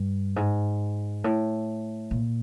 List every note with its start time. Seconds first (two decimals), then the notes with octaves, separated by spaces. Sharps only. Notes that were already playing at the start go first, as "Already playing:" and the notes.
Already playing: G2
0.36 G#2
1.24 A2
2.11 A#2